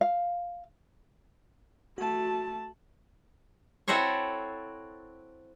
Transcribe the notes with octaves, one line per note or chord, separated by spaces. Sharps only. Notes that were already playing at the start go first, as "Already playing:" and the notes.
F5
A3 F#4 A5
C4 E4 F#4 A4 C5 C#5